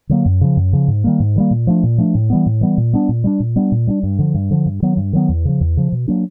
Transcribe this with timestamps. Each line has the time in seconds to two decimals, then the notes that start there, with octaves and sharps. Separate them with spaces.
0.09 D3 F#3 A#3
0.26 F#2
0.41 C#3 F3
0.57 F#2
0.73 C#3 F3
0.88 G#2
1.04 D#3 G3 A#3
1.20 G#2
1.36 D#3 G3 A#3
1.51 A#2
1.67 F3 A3 D4
1.83 A#2
1.98 F3 A3 D4
2.15 A2
2.30 E3 G3 B3
2.46 A2
2.61 E3 G3 B3
2.78 A#2
2.93 G3 B3 D4
3.09 A#2
3.24 G3 B3 D4
3.40 A#2
3.56 G3 B3 D4
3.72 A#2
3.87 G3 B3 D4
4.03 G2
4.19 D3 F3
4.35 G2
4.51 D3 F3
4.66 G2
4.82 D#3 F#3 B3
4.97 G2
5.13 D#3 F#3 B3
5.29 E2
5.45 C#3 F3
5.61 E2
5.77 C#3 F3
5.92 B2
6.08 F#3 A#3 D4